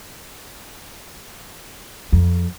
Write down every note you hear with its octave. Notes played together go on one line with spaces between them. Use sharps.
F2